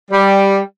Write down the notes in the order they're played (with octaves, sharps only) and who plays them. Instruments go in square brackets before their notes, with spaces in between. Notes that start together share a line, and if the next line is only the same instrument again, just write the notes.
[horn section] G3